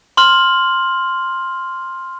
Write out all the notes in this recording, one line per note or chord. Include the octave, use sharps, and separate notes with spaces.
C6 F6 F#7